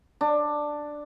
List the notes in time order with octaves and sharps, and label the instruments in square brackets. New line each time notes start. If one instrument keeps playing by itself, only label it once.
[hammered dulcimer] D4